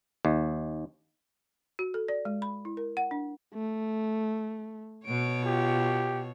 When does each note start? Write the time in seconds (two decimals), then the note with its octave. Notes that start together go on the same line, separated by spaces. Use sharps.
0.25 D#2
1.79 F#4
1.94 A4
2.08 D5
2.25 G#3
2.42 B5
2.65 E4
2.77 A#4
2.97 F#5
3.11 D4
3.54 A3
5.06 B2 C#5 D7
5.45 F4 G4